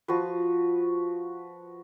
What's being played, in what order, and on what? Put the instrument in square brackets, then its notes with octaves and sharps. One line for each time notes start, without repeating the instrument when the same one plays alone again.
[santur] F3 F#4 B4